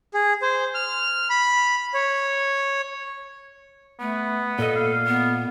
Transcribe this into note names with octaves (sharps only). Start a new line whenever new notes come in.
G#4
C5
F6
B5
C#5
A3 B3
A#2 A4 D#5
F5
B3